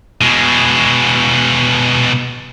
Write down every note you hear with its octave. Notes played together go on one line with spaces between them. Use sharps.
B2 G#3